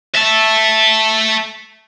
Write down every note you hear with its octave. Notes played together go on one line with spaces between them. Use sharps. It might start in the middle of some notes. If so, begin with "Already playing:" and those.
E5 A5